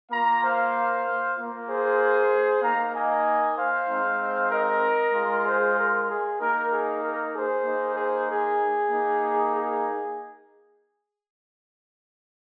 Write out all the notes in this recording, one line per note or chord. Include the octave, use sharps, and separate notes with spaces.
A#3 F4 F5 A#5
C5 F5
A#3 F4
G#4 C5
A#3 D#4 F5 A#5
D#5 G#5
C5 F5
G#3 C4 D#4
A#4 D#5
G#3 F4
G#4 C5
A#4
G#4
A#3 D#4 A#4
G#4
A#4
G#4 C5
A#3 D#4
G#4 C5
G#4
A#3 D#4
G#4